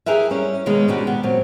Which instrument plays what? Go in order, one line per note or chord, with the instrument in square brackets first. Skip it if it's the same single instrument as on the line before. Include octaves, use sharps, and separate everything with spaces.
[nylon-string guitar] E4 G4 G#4 A#4 B4 E5
G3 C#4
B2 D#3 G#3 C#4
B2 D#3 D4 F#4 G4
B3
A#2 F#3 C4